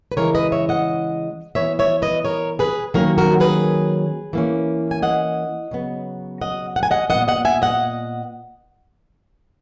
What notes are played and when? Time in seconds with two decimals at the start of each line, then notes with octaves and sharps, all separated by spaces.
0.12 B4
0.17 C#3 E3 G#3 A#4 C#5
0.35 B4 D#5
0.52 C#5 E5
0.69 D#5 F#5
1.55 E3 B3 C#5 E5
1.79 C#5 E5
2.02 B4 D#5
2.25 A#4 C#5
2.59 G#4 B4
2.94 D#3 F#3 A#3 C#4 F#4 A#4
3.18 F#4 A#4
3.40 G#4 B4
4.33 E3 A#3 C#4
4.91 G#5
5.03 D#5 F#5
5.71 C#3 F#3 B3
6.41 D#5 F#5
6.76 F#5
6.83 G#5
6.91 D#5 F#5
7.10 A#2 G#3 B3 D#5 F#5
7.28 D#5 F#5
7.45 E5 G#5
7.62 D#5 F#5